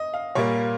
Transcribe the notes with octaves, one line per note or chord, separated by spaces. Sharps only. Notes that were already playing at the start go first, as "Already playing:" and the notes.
Already playing: D#5
F5
A#2 G3 A#3 C#5